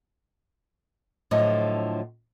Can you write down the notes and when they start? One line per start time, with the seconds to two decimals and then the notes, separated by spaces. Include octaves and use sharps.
1.31 A2 D3 F3 F#3 D#5